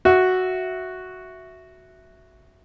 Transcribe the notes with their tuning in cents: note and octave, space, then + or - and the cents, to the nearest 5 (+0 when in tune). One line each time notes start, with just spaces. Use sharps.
F#4 +0 E5 +0